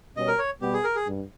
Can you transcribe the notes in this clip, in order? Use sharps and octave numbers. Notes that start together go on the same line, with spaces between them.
B2 G3 C#4 D#5
A#4
C#5
B2 G3 B3 G4
G#4
A#4
G#4
G2